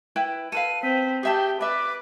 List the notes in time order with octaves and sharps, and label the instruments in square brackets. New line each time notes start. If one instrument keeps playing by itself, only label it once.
[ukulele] E4 B4 G5
[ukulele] A4 B4 F5 [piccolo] D#7
[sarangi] C4 [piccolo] B6
[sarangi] G4 [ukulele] G#4 E5 A5 [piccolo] G5
[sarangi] B4 [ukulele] D5 E5 [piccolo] D6